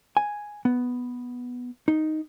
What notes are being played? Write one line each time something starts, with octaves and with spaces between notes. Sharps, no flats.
G#5
B3
D#4